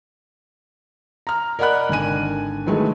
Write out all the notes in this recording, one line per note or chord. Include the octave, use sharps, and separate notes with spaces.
A#5 F6
A#4 D5 D#5 F#5 B5 F#6
G#1 D3 G#5 D#7
D#3 E3 F#3 G#3 A3